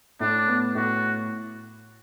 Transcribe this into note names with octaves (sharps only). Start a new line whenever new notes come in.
A2 D4
B3
A2 F#4